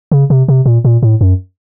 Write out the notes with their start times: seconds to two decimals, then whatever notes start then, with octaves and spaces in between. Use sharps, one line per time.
0.12 C#3
0.30 C3
0.48 C3
0.66 A#2
0.85 A#2
1.03 A2
1.21 F#2